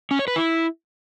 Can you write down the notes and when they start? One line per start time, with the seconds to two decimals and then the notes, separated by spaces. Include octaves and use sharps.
0.11 C#4
0.19 C#5
0.28 B4
0.36 E4